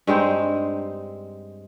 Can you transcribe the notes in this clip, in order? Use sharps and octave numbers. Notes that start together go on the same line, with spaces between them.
G2 G#3 C4 D#4